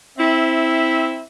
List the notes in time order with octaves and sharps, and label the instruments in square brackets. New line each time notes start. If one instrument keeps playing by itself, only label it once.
[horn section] C4 E4 E5